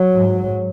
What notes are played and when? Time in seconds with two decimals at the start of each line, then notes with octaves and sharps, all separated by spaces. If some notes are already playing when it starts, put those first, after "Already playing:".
Already playing: F#3
0.14 G#2